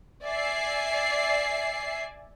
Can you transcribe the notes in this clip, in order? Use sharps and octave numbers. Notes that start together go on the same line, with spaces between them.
D5 E5 G#5 C7